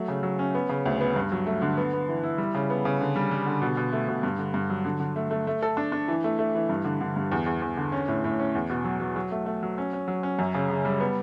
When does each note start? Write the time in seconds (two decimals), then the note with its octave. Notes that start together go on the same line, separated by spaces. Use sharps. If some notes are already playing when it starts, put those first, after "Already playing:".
Already playing: F#3 A3
0.08 C#3
0.23 F#3
0.39 C#4
0.54 B3
0.69 C#3
0.86 D2
1.01 B3
1.16 G2
1.32 F#3
1.46 A3
1.62 D3
1.77 B3
1.93 B3
2.08 E3
2.23 E4
2.38 G3
2.54 C#3
2.70 B3
2.85 C#3
3.01 D3
3.16 G3
3.31 G3
3.46 D3
3.62 B2
3.77 B2
3.93 A3
4.08 B2
4.23 G2
4.39 D3
4.54 G2
4.70 F#3
4.85 D3
5.00 D3
5.16 A3
5.31 A3
5.47 A3
5.62 A4
5.77 D4
5.92 D4
6.08 E3
6.24 A3
6.39 A3
6.55 E3
6.69 G2
6.85 D3
7.01 D3
7.16 G2
7.32 E2
7.46 E2
7.62 E2
7.77 D3
7.92 C#4
8.08 A2
8.24 A2
8.39 C#4
8.55 E2
8.70 B2
8.85 F#3
9.00 F#3
9.16 F#3
9.31 A3
9.46 A3
9.63 F#3
9.78 C#4
9.93 C#4
10.08 F#3
10.23 C#4
10.39 F#2
10.54 C#3
10.70 C#3
10.85 G3
11.00 B3